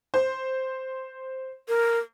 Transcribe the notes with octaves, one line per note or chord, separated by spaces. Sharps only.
C5
A#4